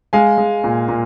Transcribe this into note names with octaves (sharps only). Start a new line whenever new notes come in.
G#3 F5 G#5
G#3
A#2
A#2